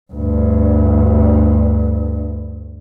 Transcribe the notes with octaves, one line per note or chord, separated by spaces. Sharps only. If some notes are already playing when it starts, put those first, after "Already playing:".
D2 G2